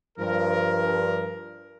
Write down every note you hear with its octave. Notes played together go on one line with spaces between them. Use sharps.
G2 F3 A#4